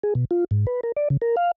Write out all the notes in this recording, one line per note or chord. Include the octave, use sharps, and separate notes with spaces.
G#4
B2
F4
G#2
B4
A#4
D5
C#3
A#4
F5